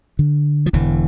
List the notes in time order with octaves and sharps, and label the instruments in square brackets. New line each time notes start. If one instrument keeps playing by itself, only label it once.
[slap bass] D3
F3
E1 E2 D3 E3